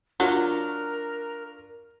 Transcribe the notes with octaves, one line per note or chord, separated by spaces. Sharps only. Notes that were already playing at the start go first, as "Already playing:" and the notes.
F#3 D4 F4 F#4 A#4